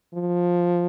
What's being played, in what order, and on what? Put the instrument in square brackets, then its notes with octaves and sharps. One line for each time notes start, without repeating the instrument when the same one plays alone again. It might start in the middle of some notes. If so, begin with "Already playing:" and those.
[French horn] F3